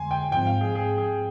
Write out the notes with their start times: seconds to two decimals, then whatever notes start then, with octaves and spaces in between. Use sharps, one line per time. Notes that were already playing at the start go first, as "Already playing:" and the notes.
Already playing: F2 D3 G#3 G#5 C6
0.11 G5
0.31 G#2 F3 C4 G5
0.47 F5
0.61 G#4
0.75 G#4
0.98 G#4